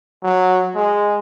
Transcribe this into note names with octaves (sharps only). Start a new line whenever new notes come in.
F#3
G#3